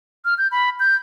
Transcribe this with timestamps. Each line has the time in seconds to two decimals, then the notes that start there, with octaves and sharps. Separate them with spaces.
0.25 F6
0.38 G6
0.52 B5
0.80 G6